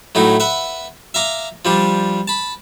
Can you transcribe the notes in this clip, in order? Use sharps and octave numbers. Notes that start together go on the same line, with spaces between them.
A2 F#3 D#4 E4
B4 E5 F#5
E5 F5 A#5 D6
F3 G3 D4
A5 B5